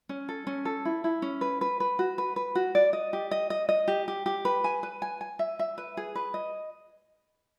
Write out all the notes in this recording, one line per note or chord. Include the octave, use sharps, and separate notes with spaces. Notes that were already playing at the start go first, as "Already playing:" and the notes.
C#4
A4
C#4
A4
E4
E4
C#4
B4
B4
B4
F#4
B4
B4
F#4
D5
D#5
G4
D#5
D#5
D#5
G4
G4
G4
B4
G#5
B4
G#5
G#5
E5
E5
B4
G#4
B4
D#5